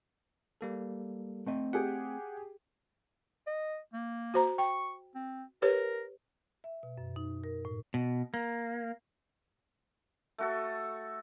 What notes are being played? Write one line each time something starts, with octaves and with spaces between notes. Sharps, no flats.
G3 A#3 A4
A3 C4 D#5
G4 G#4 F#5 G5
D#5
A#3
F#4 C5 A#5
G5 C#6
C4
G4 A#4 B4 C#5
E5
B2
F#2
D#4
A#4
A2
B2
A#3
A3 F#4 A4